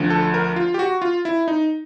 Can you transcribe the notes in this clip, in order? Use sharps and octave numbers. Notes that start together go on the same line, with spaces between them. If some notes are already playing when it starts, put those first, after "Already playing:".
Already playing: D2 D3 F3
A4
A#4
F4
G4
F#4
F4
E4
D#4